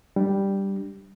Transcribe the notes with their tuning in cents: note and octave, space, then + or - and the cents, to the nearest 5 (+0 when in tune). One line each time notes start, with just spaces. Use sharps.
G3 +0 D4 +0